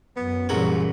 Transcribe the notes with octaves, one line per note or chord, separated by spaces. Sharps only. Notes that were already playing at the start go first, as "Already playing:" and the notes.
F#2 B3
C2 A#2 C#3 E3 F#3